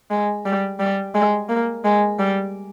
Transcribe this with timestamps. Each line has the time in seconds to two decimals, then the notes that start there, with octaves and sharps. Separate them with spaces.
0.10 G#3
0.45 G3
0.80 G3
1.15 G#3
1.49 A#3
1.84 G#3
2.19 G3